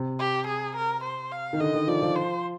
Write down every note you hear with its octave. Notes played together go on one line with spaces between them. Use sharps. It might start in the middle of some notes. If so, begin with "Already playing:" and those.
Already playing: C3
G4
G#4
A#4
C5
F5
D#3
D3 D#5
D#3
F3 D5
F3
C5